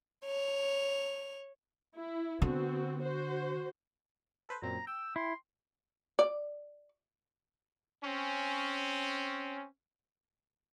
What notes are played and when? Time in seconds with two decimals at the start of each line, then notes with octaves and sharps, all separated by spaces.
0.25 C#5 F7
1.95 E4
2.42 D3 B3 C4 F#4
3.00 F#4 C5
4.49 A4 B4 C5
4.62 F#2 A#2 C4 A#5
4.87 G5 E6
5.16 E4 C6
6.19 D5
8.04 C4 C#4